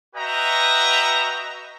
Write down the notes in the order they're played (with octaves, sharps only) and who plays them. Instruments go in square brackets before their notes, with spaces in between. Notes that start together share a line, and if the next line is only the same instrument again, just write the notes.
[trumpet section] F#4 B4 D#5 E5 G5 A#5